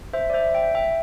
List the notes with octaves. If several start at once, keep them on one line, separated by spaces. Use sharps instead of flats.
C5 E5
D5
C5 E5
E5 G5
E5 G5